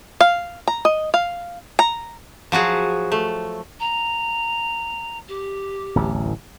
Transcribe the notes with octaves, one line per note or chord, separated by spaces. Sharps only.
F5
A#5
D#5
F5
A#5
F3 F#3 F#4 G#4
A3
A#5
G4
D1 A1 E2